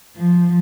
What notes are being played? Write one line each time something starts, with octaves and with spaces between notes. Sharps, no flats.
F3